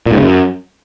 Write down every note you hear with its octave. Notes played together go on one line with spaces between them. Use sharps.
A#2
G#2
C#3
F#2